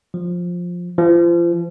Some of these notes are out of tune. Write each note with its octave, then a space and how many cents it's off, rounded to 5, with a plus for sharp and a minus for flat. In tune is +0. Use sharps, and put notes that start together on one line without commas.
F3 +10
F3 -35